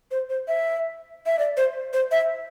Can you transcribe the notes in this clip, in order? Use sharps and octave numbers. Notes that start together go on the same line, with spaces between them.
C5
C5
E5
E5
D5
C5
C5
E5